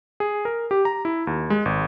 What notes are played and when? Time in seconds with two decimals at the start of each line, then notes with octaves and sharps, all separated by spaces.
0.20 G#4
0.45 A#4
0.71 G4
0.85 A#5
1.05 E4
1.27 D#2
1.50 G#3
1.65 G#1